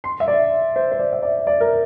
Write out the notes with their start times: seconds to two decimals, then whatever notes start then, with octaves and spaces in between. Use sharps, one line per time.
0.04 C6
0.20 E5
0.28 D5
0.76 C5
0.92 C5
0.99 D5
1.13 E5
1.23 D5
1.47 D5
1.60 A#4